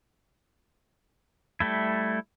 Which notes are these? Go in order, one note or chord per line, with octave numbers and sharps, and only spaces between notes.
G3 A3 E4